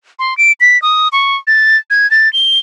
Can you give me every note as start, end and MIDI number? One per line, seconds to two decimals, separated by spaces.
0.19 0.36 84
0.38 0.52 98
0.60 0.80 95
0.82 1.08 87
1.12 1.36 85
1.47 1.77 93
1.90 2.10 92
2.11 2.31 93
2.33 2.59 103